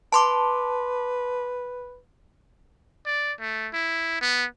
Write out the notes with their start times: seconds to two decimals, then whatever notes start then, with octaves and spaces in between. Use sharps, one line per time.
0.12 B4 A5 C6 D6
3.06 D5
3.40 A3
3.73 E4
4.21 B3